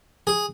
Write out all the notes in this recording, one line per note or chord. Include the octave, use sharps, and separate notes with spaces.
G#4